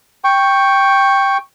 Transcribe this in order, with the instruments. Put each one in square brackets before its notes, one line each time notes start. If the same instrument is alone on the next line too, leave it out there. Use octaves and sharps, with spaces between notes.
[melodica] G5 C#6